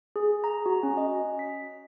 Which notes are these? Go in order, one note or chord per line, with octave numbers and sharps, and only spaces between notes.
G#4
A#5
F#4
C#4
D#5
B6